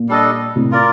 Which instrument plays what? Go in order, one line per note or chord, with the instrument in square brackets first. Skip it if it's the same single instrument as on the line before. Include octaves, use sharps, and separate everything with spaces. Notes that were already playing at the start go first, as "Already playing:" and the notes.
Already playing: [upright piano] A#2
[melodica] G3 D4 A4 D#5
[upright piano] A2 C3
[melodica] F4 A#4 D5